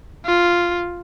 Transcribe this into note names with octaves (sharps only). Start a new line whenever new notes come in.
F4